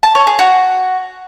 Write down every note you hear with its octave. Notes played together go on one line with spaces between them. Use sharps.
A5
C#5
G#4
F#4